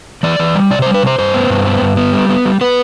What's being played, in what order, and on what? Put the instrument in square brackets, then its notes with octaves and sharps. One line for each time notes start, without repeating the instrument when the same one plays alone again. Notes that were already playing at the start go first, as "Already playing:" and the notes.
[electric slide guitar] E3 D5
E3
G3
C3 D5
C5
G3
B4
C3 C5
G2 C5
B3
G2
B3
G2
B3
G3
B3
G3
B3 B4